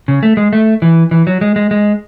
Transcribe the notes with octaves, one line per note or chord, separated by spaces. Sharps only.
C#3
A3
G#3
A3
E3
E3
F#3
G#3
G#3
G#3